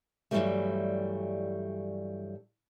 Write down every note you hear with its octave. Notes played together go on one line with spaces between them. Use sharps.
G2 D3 E3 F#3 G3 A3